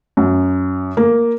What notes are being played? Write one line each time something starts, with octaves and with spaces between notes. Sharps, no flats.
F#2
A#3